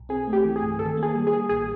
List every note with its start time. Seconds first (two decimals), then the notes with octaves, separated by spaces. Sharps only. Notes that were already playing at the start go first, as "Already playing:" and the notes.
Already playing: B1
0.09 C4 G#4
0.27 A3
0.33 G4
0.45 E3
0.56 G#4
0.62 G2
0.79 D#3 A4
0.97 A#3
1.03 G#4
1.15 G3
1.27 G#4
1.32 D#3
1.49 A1 G#4